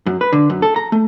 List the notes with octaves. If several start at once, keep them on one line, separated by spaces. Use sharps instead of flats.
F#2
B4
D3
F#2
A4
A#5
A3